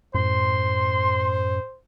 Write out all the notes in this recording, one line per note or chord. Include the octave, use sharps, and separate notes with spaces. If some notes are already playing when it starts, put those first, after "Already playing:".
F#2 A2 C5 C6